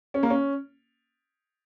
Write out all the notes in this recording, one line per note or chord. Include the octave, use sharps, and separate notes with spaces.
C#4
A#3
C#4